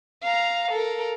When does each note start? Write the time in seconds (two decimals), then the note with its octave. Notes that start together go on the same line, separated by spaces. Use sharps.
0.23 F5 A#5
0.71 A4 A#4